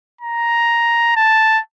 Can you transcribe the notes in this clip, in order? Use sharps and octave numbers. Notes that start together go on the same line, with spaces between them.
A#5
A5